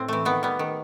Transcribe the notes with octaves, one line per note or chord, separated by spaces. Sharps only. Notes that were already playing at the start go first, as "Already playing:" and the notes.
Already playing: A2 C4
E3 A3
D#3 B3
G3 B3
D#3